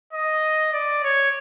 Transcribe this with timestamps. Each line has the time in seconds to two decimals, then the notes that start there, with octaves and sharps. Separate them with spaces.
0.13 D#5
0.73 D5
1.04 C#5